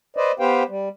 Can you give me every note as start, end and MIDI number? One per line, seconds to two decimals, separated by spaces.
0.16 0.32 71
0.16 0.32 72
0.16 0.32 74
0.16 0.32 75
0.39 0.63 59
0.39 0.63 67
0.39 0.63 71
0.39 0.63 72
0.39 0.63 77
0.39 0.63 79
0.68 0.89 55